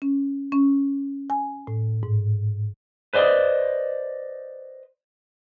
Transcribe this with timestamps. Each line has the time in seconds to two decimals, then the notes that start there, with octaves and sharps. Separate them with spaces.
0.02 C#4
0.52 C#4
1.30 G#5
1.67 A2
2.03 G#2
3.13 B4 C5 D5 D#5